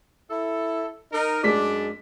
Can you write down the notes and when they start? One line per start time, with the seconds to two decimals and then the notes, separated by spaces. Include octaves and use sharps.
0.30 E4 A4
1.12 D#4 A#4
1.44 F#2 G#3 D4 B6